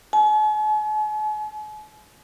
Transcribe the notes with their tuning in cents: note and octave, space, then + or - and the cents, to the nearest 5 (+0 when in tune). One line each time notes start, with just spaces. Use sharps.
G#5 +45